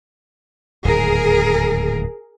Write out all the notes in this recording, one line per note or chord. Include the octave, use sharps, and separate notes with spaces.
D1 D#2 G#2 G#4 A#4